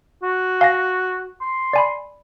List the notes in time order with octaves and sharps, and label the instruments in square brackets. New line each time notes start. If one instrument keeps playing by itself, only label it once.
[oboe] F#4
[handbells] F5 G#5 A#6
[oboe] C6
[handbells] D5 G#5 B5